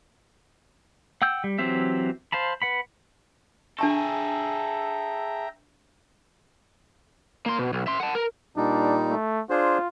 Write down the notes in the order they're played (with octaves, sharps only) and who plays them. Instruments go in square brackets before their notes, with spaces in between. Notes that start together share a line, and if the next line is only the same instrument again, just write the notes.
[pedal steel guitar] F#5 G5 E6 G6
G3
E3 F#3 C4 G4 E5
C5 F5 A5 B5
B4 F#5 B5
[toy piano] D4 A5 C#6 [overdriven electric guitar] G#4 A4 [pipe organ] E5 G5 A#5
[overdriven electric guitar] A#3 C6
B2
B1
E5 C6
F#5 A5
A#4
[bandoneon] A#2 G3 D#4 [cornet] D4
[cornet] A3
[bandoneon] D4 G#4 C5 [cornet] F4